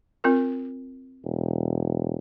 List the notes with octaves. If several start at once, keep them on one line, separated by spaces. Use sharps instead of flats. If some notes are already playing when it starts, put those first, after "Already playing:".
C4 F4 A#4
E1